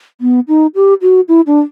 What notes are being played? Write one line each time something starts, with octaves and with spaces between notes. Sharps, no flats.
B3
D#4
G4
F#4
E4
D4